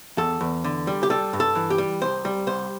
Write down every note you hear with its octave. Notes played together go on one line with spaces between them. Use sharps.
E2 A4
E2
D3
G3
G4
G3 A4
G2
A4
E3
G4
G3
C2 C5
G3
C2 C5